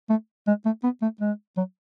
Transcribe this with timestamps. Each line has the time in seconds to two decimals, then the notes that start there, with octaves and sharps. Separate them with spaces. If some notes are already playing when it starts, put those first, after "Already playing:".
0.10 A3
0.47 G#3
0.65 A3
0.83 B3
1.02 A3
1.20 G#3
1.57 F#3